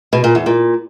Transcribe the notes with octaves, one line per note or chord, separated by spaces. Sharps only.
B2
A#2
E2
A#2